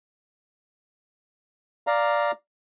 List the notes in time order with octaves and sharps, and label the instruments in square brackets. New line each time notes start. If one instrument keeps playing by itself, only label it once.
[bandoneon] D5 F5 A#5